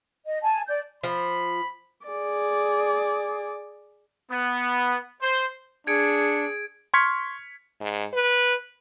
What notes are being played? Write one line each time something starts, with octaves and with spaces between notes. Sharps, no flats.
D#5
G#5 A5
D5 G6
F3 B5
G#4 D5
B3
C5
D4 G#4 G#6 C#7 D7
C6 C#6 F6 G#6 B6 C#7
G#2
B4